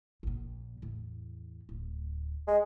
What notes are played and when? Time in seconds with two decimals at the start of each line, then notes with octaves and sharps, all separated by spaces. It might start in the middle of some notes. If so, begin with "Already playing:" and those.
0.23 A#1 A#2
0.82 E2 A2
1.69 D1
2.47 G#3